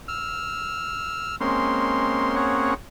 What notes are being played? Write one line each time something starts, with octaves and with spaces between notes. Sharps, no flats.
E6 F6
G#3 A#3 C4 C#4 C6
G#4 C#5 F#5